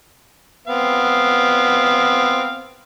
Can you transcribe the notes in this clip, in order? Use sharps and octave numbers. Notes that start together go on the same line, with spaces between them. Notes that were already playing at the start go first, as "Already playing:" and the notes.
B3 C4 F5